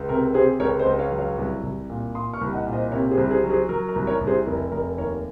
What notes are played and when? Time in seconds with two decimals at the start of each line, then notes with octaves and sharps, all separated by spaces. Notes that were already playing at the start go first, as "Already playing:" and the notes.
Already playing: C#2
0.09 C3 A#4
0.34 C3 G#4 C5
0.60 C#2 A#4 C#5
0.79 C5 D#5
0.86 C#2
0.99 C#5 F5
1.11 F#3
1.18 C#5 F5
1.38 C2
1.63 C2
1.90 A#2
2.15 A#2 C6 D#6
2.34 C#6 F6
2.41 C2
2.53 D#5 F#5
2.67 A#2
2.73 C5 D#5
2.92 C3 A#4 C#5
3.11 G#4 C5
3.17 C2
3.30 G#4 C5
3.44 F#3
3.50 G#4 C5
3.69 F#3 A#4
3.88 A#4
3.96 C2
4.07 A#4 C#5
4.21 C2
4.27 G#4 C5
4.46 F1 A#4
4.72 F1 A#4
4.98 D#2 A#4 C#5